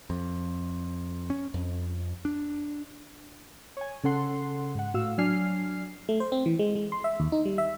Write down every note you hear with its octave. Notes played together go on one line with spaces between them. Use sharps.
F2
C#4
F2
D4
C#5 G#5
C#3 C#4 A4 F#5 C6
G#2 F#5
A2 F#4 F5 E6
F#3 D4 G#5 F6 C7
A3
C5
C4
E3
G#3
G#3
C6
E5
D#2
D#4
G3
E5